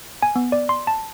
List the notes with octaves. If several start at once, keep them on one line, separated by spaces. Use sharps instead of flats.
G#5
B3
D5
C6
A5